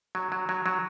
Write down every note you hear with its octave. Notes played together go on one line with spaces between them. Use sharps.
F#3
F#3
F#3
F#3